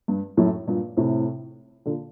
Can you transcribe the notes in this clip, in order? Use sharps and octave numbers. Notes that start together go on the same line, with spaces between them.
G2
F#2 A2
G2 A#2
A2 C3
A#2 D3